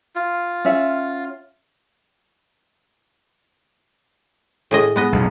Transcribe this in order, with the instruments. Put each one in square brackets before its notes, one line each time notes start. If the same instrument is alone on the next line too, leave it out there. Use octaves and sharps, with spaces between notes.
[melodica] F4
[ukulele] C#4 E5 F#5
[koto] A2 G#4 D#5
G#3 B3 D#5
[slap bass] B1 F2